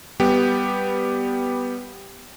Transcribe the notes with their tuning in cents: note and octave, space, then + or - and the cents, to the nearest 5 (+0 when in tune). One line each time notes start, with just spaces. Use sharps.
G3 +0 B3 +0 G4 +0